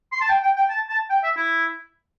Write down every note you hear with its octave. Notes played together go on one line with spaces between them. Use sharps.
C6
A5
G5
G5
G5
A5
A5
G5
E5
E4